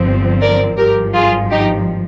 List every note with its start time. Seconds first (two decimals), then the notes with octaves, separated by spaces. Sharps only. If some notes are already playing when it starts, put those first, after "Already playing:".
Already playing: G1 G2 F3 C4
0.42 A#4 D5
0.78 G#1 G2 F3 G4 A#4
1.15 F4 G#4
1.51 D#4 G4